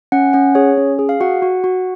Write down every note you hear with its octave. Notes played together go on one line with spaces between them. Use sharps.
C#4 F#5
C#4 F#5
G#4 C#5
C#4
G#4
F5
F#4 F#5
F#4
F#4